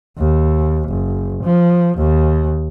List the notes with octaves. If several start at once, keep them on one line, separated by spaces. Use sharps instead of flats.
D#2
F#1
F3
D#2